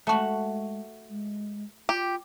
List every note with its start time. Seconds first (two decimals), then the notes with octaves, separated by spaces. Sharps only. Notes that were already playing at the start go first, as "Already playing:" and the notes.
0.07 G#3 A3 F#4 C#5 A5 C#6
1.10 G#3
1.89 F4 G4